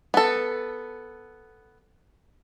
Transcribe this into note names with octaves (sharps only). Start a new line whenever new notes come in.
B3 A4